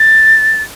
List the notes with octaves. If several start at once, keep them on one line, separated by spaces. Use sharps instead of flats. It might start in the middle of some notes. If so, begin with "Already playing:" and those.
Already playing: A6